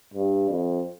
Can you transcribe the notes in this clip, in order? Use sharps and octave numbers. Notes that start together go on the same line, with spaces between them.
G2
F2